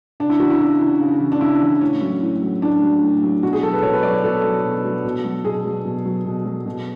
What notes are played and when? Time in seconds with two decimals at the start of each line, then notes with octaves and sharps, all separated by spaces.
0.20 C#3 D4
0.30 E4
0.39 E3 F#4
0.50 E4
0.60 C#3 D4
0.80 E3
1.01 C#3
1.20 E3
1.32 D4
1.40 C#3 E4
1.61 E3
1.81 A2 C#4
2.01 F#3
2.22 A2
2.41 F#3
2.62 A2 D4
2.83 F#3
3.02 A2
3.23 F#3
3.43 B2 F#4
3.53 G#4
3.62 F#3 A4
3.73 B4
3.83 B2 C#5
3.93 B4
4.03 F#3 D5
4.14 C#5
4.24 B2 A4
4.44 F#3
4.63 B2
4.85 F#3
5.04 B2
5.24 F#3
5.45 B2 G#4
5.65 F#3
5.85 B2
6.05 F#3
6.25 B2
6.45 F#3
6.66 B2